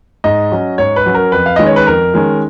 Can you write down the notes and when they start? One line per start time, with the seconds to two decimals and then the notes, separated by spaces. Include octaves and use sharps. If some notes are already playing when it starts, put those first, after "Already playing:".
0.24 G#2 D#5
0.52 F#3 C#4
0.78 G#2 C#5
0.96 B4
1.06 F#3 C#4
1.14 A#4
1.32 F2 B4
1.46 F5
1.56 D#3 G#3 C#4 D#5
1.66 C#5
1.76 B4
1.86 F2 A#4
2.14 D#3 G#3 C#4